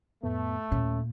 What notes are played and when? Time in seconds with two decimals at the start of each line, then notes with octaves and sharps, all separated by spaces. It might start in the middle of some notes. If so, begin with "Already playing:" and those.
0.23 F2 A2 A3 B3
0.72 D#2 A#2 C#4